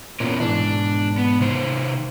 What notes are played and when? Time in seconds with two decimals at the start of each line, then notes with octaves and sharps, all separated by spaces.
0.20 A#2 B3 C#4 A#4
0.40 G#2 B2 E3 D4
1.18 B3
1.40 C3 D#3 C5